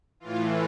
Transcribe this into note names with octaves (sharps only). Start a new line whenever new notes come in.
A2 E3 F4